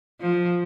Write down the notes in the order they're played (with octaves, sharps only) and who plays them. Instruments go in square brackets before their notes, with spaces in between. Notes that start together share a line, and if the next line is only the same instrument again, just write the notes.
[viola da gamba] F3